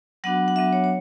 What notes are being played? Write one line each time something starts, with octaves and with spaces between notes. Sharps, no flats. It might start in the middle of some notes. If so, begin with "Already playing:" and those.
F#3 B3 D4 F#4 F#5
F#5
F#3 B3 D4 F#4 E5
C#5
C#5